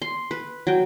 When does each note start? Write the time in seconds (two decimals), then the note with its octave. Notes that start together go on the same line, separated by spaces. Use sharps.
0.02 C6
0.31 B4
0.67 F#3 G5